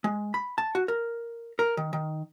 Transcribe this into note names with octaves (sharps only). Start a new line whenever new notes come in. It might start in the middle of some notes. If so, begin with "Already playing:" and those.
G#3
B5
A5
F#4
A#4
A#4
D#3
D#3